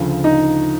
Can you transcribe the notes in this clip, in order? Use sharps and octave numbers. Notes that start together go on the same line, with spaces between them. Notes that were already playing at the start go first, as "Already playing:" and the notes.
Already playing: D2 C#3 F3
D#4